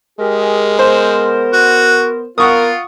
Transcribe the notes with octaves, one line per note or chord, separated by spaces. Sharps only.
G#3 G4 G#4 A#4
B3 A#4 C5
F#4
B3 F4 A#4 F#5 C#6 D#6